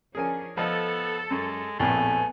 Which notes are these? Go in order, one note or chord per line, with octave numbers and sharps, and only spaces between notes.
F3 C#4 D4 G#4 A#4 G#5
F3 B3 A4 D#5 A5
F#2 G#3
A#1 F2 A2 A3 B3 G#5